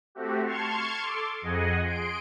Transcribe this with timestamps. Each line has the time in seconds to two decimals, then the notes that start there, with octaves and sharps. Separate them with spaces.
0.15 A3 C4 F#4 G4
0.44 A5 C6 C#6 F6 G#6
1.03 A4 C6 D6
1.42 F2 G#4 D#5 F#5 G#5
1.84 G#4 C6 D7